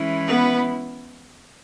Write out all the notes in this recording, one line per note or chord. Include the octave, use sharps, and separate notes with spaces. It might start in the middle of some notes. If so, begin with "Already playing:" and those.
Already playing: E3 G#3 C#4 E4
B3 B4